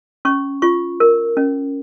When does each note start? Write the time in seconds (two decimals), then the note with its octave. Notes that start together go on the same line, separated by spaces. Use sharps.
0.25 C#4 C#6
0.62 F4 C#6
1.00 A#4
1.37 C#4